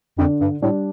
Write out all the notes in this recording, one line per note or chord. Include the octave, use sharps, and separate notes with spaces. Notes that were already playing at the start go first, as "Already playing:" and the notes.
F2 D3
G2
A2 G3 D4